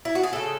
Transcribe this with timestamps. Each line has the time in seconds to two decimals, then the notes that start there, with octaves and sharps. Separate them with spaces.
0.05 E4
0.15 F#4
0.23 G#4
0.33 C#3 G#3 A4